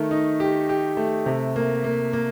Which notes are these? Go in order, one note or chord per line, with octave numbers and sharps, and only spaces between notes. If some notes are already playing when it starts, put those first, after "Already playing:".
Already playing: D#3 A3
D#4
G4
G4
A3
C3
A#3
A#3
A#3